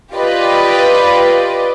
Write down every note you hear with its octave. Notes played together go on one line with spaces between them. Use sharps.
F4 G4 B4 D5 D#5